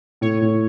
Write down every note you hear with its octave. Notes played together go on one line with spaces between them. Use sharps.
A2 C#5
A2